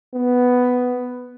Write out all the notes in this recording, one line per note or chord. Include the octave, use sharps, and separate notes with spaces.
B3